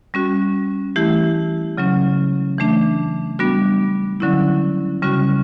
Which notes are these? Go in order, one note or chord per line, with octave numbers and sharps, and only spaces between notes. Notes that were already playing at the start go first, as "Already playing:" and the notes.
G3 C#4 F#4
E3 A3 E4 G4
C#3 F#3 C#4
E3 A3 D4
G3 B3 D4 F#4
D3 F#3 C#4 E4
C#3 G3 C#4 F#4